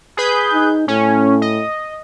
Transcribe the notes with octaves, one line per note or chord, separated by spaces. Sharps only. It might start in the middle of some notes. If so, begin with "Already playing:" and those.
G#4 B4 G6
D#4
A2 C#4
D#5